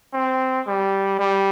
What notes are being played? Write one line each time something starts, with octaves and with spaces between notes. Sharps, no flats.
C4
G3
G3